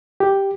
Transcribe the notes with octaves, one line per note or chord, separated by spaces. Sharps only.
G4